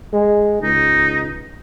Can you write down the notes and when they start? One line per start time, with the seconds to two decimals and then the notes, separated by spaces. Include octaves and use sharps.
0.13 G#3
0.62 C#2 D#4